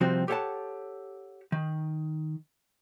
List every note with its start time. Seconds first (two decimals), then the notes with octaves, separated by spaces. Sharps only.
0.01 C3 F3 G3 C4 F#4
0.28 G4 A4 C#5 F5 F#5 A5
1.52 D#3